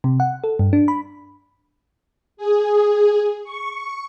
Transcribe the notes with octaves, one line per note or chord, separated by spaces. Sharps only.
C3
F#5
A4
G2
D4
B5
G#4
C#6